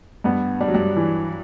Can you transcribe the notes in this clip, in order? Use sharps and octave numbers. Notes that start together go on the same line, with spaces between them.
G2 G3 B3
G3 D4
F#3
G2 G3
E3